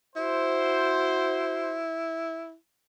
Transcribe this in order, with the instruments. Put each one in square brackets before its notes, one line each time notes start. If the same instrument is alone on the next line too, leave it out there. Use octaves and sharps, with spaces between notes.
[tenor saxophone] E4 [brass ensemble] F#4 C5